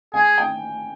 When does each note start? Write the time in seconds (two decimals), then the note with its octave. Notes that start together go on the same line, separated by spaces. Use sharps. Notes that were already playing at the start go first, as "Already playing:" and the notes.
0.14 G#4 G#5
0.38 G5